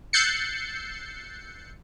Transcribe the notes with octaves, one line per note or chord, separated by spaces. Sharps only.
E6 F#6 G6 A6 C7 C#7